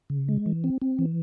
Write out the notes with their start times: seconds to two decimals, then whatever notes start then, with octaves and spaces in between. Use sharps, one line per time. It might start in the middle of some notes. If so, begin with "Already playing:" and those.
0.10 C#3
0.28 G#3
0.46 E3
0.64 C4
0.82 C4
0.99 E3